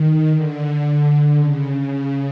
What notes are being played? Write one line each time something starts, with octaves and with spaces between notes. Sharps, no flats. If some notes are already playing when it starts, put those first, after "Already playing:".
Already playing: D#3
D3
C#3
C#3